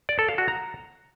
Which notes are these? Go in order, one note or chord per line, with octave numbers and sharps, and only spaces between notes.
D5
A4
F5
F#4
A#5